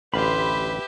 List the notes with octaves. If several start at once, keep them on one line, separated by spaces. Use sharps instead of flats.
A1 D2 G4 B4 E5 F5 B5 C6